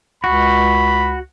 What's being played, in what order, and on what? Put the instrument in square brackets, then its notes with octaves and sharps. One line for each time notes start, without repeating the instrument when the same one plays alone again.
[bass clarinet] C#2 [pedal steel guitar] F#4 [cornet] B5